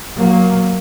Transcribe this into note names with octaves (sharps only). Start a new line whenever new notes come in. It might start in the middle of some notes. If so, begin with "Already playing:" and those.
F#3 A#3